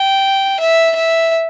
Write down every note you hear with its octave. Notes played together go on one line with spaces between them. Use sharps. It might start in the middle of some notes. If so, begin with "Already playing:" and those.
Already playing: G5
E5
E5